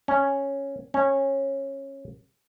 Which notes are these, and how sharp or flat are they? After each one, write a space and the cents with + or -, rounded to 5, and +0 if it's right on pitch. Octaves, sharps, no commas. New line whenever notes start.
C#4 -5
C#4 -20